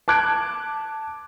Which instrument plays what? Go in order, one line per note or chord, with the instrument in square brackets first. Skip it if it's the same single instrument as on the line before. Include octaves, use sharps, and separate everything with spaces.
[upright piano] A5 D6 F#6 G#6 D7